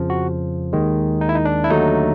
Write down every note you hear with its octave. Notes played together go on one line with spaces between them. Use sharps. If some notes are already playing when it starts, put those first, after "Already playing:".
Already playing: F2 C#3 F3
F#4
D#2 D#3 G#3
D#4
E4
D#4
D4
E4
D#2 D3 F#3 A3 D#4